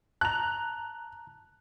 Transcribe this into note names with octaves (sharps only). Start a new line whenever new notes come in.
A5 A#5 F#6 F7